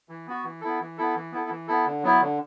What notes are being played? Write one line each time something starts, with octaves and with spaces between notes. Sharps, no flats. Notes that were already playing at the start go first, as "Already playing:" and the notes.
E3
B3 F#4
E3
B3 E4 A4
E3
B3 E4 A4
E3
B3 E4 A4
E3
B3 E4 A4
D3
F#3 B3 E4
D3